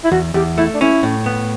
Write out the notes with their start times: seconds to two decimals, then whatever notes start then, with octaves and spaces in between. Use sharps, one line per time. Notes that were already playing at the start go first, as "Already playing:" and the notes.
0.04 E4
0.12 E2 F#4
0.34 E2 G4
0.57 A3 E4
0.74 D4
0.81 C#4 E4
1.03 A2
1.26 B3